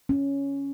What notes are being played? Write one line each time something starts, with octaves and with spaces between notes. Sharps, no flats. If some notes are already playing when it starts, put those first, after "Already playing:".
C#4